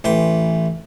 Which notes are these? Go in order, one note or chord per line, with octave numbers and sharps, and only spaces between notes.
A1 E3 G5 C6